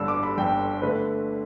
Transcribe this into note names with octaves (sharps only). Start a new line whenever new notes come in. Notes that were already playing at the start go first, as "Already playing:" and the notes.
Already playing: G1 G2 D3 E6
D6
B5
G1 G2 D3 G5
D3 A3 B4